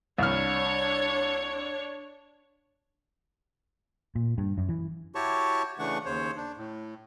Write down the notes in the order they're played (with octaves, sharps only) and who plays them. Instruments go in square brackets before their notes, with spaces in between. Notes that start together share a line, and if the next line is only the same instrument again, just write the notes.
[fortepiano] C2 F6 [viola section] D4 C#5
[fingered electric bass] A#2
G2
F#2
E3
[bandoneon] E4 F#4 G4 C#5 A5 C#6
C#3 E3 A3 D4 F#5 C#6
D#2 C#3 C5 C#5
D4
A2